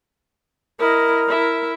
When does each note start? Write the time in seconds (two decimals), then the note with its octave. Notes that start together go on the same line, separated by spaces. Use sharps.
0.79 E4 A#4 D#5
1.28 E4 E5